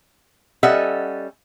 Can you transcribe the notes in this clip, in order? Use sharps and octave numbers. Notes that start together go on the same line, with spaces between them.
G3 C#4 A4 D#5 E5 F#5